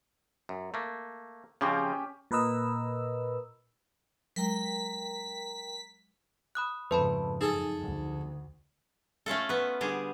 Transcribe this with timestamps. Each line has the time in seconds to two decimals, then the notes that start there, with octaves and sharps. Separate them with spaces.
0.49 F#2
0.74 A3 A#3
1.61 C#3 F3 C4 C#4 G4
2.31 A#2 A#4 B4 D#5 E6
4.36 F#3 G#3 A#4 G5 A#5 B6
6.55 B5 D#6 F#6
6.91 F2 G#2 C#3 A3 B4 C5 A5 B5
7.41 F#2 D#4 G#4 A4 A5
7.81 D2
9.26 A3 C#4 F4 A4
9.49 B3 B4
9.81 D3 G3 G#4